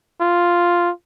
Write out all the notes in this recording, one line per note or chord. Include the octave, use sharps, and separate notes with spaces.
F4